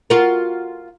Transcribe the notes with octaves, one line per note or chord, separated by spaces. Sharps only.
F4 F#4 A#4